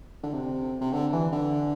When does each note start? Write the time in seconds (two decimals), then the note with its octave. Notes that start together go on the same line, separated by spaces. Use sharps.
0.23 D3
0.33 C3
0.81 C3
0.92 D3
1.13 E3
1.33 D3